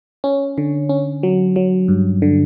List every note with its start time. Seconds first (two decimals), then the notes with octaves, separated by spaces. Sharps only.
0.24 C#4
0.58 D3
0.89 C#4
1.23 F#3
1.56 F#3
1.88 G2
2.22 D3